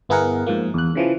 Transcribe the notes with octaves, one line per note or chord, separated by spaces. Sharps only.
G1 B3 E4 G#4 A#4 F#5
G#2 F3 A#3
E2 F#6
C#3 E3 F3